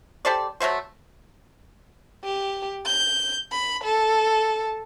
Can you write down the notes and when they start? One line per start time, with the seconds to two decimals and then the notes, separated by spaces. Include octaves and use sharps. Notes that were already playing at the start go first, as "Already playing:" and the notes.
0.25 G4 A4 C5 D5
0.60 F#3 A3 A#3 C5
2.24 G4
2.86 G6
3.52 B5
3.84 A4